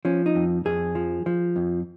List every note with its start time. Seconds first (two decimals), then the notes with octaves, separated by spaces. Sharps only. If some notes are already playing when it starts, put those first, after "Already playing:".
0.05 F3 C#4
0.26 D#4
0.35 F2
0.65 F2 G#4
0.95 F3
1.26 F3
1.56 F2